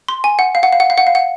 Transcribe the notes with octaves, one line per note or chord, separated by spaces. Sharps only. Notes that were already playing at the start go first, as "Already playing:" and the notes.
C6
G#5
F#5
F5
F#5
F5
F#5
F5
F#5
F5
F#5